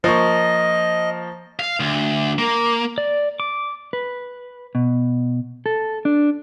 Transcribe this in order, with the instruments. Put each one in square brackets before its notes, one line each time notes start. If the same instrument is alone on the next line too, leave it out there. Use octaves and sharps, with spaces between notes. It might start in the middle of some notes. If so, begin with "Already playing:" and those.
[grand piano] F3 A#3 C#6 [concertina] D#5
[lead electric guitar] F5
D2
A#3
[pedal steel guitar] D5
D6
[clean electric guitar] B4
B2
A4
D4